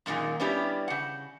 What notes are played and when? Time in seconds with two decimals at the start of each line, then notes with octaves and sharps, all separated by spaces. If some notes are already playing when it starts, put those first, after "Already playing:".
0.06 F#2 A#2 D3 D#3 G#3
0.40 G3 B3 C#4 D4 E4 G4
0.88 C#3 F#5